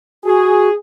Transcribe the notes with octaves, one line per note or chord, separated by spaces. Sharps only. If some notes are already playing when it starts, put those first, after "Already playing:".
F#4 G#4